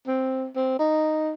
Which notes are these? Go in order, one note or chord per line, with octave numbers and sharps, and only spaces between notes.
C4
C4
D#4